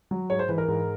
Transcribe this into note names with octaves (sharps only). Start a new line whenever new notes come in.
F#3
G#2 C#5
C5
E3 B4
A#4
G#2